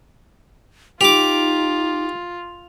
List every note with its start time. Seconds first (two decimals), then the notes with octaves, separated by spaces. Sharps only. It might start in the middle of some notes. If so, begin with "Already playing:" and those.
1.01 D#4 F4 G4 D6 F7